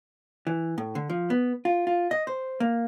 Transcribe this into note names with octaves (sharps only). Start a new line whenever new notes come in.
E3
A2
D3
F3
B3
F4
F4
D#5
C5
A#3